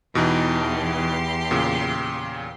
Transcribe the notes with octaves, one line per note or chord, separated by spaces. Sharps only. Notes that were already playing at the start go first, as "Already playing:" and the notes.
E2 B2 E3 D#4 G4 C6
A#2 C#3